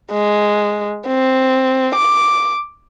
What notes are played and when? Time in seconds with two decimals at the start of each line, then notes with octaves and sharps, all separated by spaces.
0.11 G#3
1.07 C4
1.95 D6